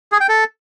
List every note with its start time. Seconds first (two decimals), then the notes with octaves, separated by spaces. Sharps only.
0.12 G#4
0.20 G5
0.29 A4